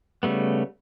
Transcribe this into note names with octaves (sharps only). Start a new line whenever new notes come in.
C#3 G3 A3 B3